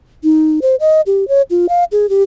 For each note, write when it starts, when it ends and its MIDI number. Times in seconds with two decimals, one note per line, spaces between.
0.24 0.60 63
0.62 0.76 72
0.80 1.01 75
1.06 1.28 67
1.28 1.42 73
1.50 1.66 65
1.69 1.84 77
1.92 2.09 68
2.09 2.23 67